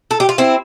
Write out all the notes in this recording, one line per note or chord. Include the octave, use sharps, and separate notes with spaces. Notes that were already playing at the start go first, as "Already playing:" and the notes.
A4
G4
F4
C4 E4